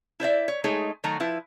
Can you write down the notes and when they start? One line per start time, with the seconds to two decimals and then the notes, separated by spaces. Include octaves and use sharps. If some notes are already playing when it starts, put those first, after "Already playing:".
0.20 E4 C5 D5 E5
0.48 C#5
0.64 G#3 A3 D#4 G#4 C#5
1.04 D#3 F#3 A3 F#4 A#5
1.20 F3 E4 B4